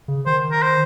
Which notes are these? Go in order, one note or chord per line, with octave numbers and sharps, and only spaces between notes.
C#3
D#3 C5
A#4
C5